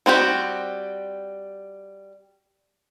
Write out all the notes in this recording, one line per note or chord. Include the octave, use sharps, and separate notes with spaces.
G3 C4 F#4 G4